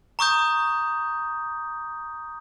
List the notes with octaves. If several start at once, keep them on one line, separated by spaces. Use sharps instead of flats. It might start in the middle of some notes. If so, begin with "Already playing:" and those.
A#5 C#6 D#6 G6